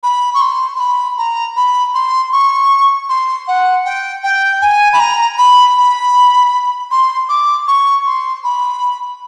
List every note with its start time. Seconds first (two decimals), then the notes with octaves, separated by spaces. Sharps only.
0.03 B5
0.34 C#6
0.41 C6
0.76 C6
0.80 B5
1.18 A#5
1.56 B5
1.95 C6
2.33 C#6
3.09 C6
3.48 F#5
3.85 G5
4.24 G5
4.62 G#5
4.93 B5
5.00 A#5
5.38 B5
5.76 B5
6.91 C6
7.29 D6
7.67 C#6
8.06 C6
8.44 B5